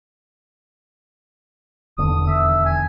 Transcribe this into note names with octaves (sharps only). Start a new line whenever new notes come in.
D#1 E2 D3 D#6
E5
G#5